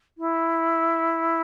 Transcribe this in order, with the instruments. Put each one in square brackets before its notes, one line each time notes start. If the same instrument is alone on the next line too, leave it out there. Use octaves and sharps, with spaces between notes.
[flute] E4